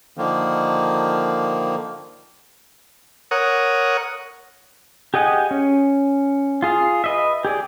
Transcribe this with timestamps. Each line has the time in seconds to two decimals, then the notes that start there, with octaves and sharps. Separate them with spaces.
0.17 D3 D#3 F3 A#3
3.31 A#4 C#5 F#5 D#6
5.14 G4 G#4 D#5 F#5 G#5
5.51 C#4
6.62 F4 G#4 F5
7.04 B4 D#5 E5
7.45 G4 G#4 D5